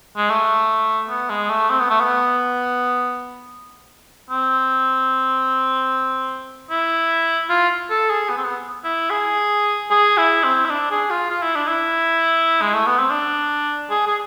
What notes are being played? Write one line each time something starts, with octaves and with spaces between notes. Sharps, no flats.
G#3
A3
B3
G#3
A3
C4
B3
A3
B3
C4
E4
F4
A4
G#4
B3
C4
B3
E4
G#4
G#4
E4
C4
E4
D4
G#4
F4
F4
E4
D4
E4
G#3
A3
B3
C4
D4
G#4
G#4